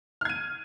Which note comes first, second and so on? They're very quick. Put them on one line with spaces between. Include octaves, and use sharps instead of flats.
F6 G#6 D#7